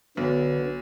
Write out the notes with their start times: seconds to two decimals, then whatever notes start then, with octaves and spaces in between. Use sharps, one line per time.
0.17 B1 D3 B3